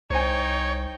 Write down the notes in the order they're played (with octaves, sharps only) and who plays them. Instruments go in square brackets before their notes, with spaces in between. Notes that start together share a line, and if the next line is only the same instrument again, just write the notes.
[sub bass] C2 [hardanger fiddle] D#4 G5 [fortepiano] C5 G#5 [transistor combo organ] C#5